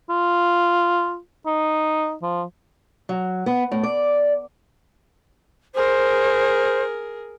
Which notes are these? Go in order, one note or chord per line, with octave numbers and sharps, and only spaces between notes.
F4
D#4
F3
F#3
B3
A2
D5
G#4 A#4 C5